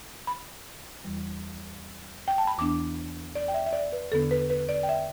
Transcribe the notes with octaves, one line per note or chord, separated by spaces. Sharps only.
B5
E2 E3 G3
G5
A5
B5
E2 E3 B3 D4 D6
D5
G5
E5
E5
D5
B4
E2 D3 B3 D4 A4
B4
B4
D5
G5
E5